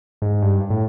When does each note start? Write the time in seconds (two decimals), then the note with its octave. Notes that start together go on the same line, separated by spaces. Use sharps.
0.22 G#2
0.42 G2
0.70 A2